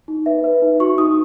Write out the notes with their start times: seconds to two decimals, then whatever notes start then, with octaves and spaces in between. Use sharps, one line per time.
0.08 D#4
0.26 B4 E5
0.44 B4
0.62 D#4
0.80 F#4 C#6
0.98 D#4 D#6